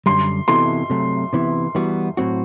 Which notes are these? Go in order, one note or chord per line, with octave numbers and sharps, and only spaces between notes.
F#2 D3 G3 C6
C3 E3 B3 E4 A4 C6
C3 F#3 A3
C3 E3 B3 E4
E3 G3 B3 F#4
A2 F#3 C4 F#4